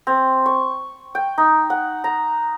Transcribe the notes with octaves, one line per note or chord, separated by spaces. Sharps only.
C4
C#6
G5
D#4
F#5
A#5